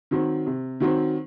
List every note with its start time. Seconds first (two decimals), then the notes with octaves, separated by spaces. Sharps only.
0.11 D#3 F#3 C4
0.47 C3
0.80 D#3 F#3 C4